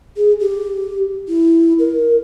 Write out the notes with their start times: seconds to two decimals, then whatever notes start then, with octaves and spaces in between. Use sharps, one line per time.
0.17 G#4
0.40 G4
1.28 E4
1.79 A#4